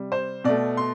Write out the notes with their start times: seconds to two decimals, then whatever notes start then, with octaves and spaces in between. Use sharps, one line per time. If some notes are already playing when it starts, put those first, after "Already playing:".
Already playing: C3 G3
0.12 C5
0.44 B2 A3 D5
0.77 C6